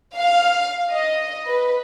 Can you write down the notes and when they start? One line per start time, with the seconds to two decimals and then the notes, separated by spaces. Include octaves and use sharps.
0.15 F5
0.91 D#5
1.47 B4